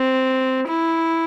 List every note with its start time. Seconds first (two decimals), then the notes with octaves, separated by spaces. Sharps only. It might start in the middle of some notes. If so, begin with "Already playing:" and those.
Already playing: C4
0.67 E4